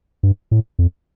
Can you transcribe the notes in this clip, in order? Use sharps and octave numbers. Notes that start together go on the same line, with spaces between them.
G2
A2
F2